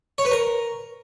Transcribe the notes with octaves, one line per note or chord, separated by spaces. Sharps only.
C#5
B4
A#4